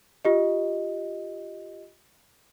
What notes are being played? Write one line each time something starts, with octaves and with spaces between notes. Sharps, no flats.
F4 G4 D#5